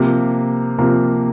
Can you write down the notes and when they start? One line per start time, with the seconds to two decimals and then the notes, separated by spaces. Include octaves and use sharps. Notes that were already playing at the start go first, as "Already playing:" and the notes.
Already playing: C3 F3 A#3
0.78 C3 F3 A#3